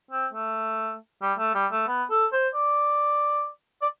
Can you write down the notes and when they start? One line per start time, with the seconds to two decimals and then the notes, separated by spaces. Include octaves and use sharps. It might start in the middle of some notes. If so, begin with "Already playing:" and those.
0.11 C4
0.33 A3
1.22 G3
1.38 A3
1.55 G3
1.71 A3
1.88 B3
2.10 A4
2.33 C5
2.54 D5
3.82 D5